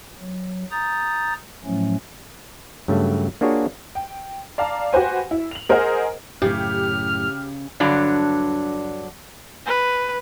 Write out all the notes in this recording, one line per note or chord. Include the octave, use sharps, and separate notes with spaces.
F#3
A#5 D#6 G6 A6
A2 F3 F#3 A3 C#4
G2 C#3 F#3 A3
A#3 D4 F4 F#4 G#4 C#5
G5
D5 F5 A5 A#5
F#4 G4 B4 C5 G#5
E4
F7 F#7
G#4 A#4 C5 D#5 F#5
F#2 A2 C#3 G4 F6
G2 D3 F#3 D4
B4